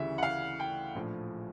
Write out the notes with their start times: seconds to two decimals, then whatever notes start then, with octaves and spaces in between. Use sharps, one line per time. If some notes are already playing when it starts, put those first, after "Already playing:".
Already playing: D2 C#3 E3 G3 E5
0.18 F#5
0.23 F5
0.60 G5
0.95 A#1 A2 F3